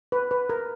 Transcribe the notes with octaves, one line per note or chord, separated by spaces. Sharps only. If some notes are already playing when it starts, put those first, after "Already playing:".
B4
B4
A#4